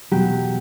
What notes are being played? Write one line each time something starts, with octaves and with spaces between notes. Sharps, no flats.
E2 B2 F#3 G4